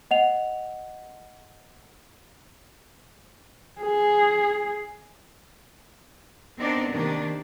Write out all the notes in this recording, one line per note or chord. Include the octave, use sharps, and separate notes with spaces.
D#5 F#5 F7
G#4
B3 C4 D4 D#4 A#4 D5
C3 D#3 A#3 D4 D5